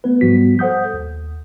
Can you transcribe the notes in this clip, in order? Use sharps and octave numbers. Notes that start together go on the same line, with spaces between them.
A3 B3 B4
G#2 F3 G3 B3 F#4 B6
A4 C5 F#5 D#6 G6
D#2